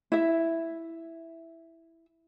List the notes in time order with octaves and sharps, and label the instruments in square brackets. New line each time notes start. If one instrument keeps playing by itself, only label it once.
[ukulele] E4 E5